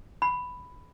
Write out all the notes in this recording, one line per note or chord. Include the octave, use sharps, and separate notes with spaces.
B5